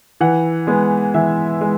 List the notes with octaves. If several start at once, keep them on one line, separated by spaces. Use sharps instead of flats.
E3 F#5
G#3 B3
E3 E5
G#3